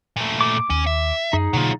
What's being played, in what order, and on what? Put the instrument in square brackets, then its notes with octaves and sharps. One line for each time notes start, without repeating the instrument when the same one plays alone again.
[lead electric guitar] A#2 A3
[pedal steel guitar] D6
[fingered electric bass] D#2 [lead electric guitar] C#4
[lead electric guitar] E5
[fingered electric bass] F#2 [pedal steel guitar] D#4 G#4
[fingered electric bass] B2 D3 A#3 [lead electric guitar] F#3 F4